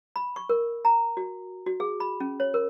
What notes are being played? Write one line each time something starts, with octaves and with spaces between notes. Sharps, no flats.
B5
C#6
A#4
A#5
F#4
F#4
G#4
B5
C#4
C#5
A#4